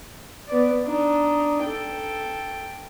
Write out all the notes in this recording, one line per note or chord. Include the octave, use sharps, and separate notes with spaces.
B3 D5
D4 D#4
A4 G5